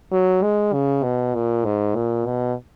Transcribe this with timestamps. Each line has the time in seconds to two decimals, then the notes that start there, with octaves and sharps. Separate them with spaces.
0.12 F#3
0.43 G#3
0.73 C#3
1.03 B2
1.35 A#2
1.65 G#2
1.95 A#2
2.26 B2